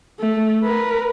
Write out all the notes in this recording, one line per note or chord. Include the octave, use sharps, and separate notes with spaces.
A3
A#4 B4